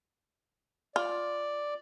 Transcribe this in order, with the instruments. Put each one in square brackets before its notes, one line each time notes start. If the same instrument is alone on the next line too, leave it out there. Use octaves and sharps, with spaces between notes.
[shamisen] F4 [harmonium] D5